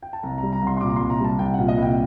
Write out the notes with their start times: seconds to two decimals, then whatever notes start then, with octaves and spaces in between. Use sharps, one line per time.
0.03 G5
0.13 A5
0.23 C2 A#5
0.38 G3 A#5
0.53 A#5
0.62 C2 C6
0.77 C6
0.81 A#2 D6
0.89 A#5
0.96 C2 C6
1.10 A#5
1.20 G3 A5
1.39 C2 G5
1.54 A#2 F#5
1.68 D#5
1.78 C2 G5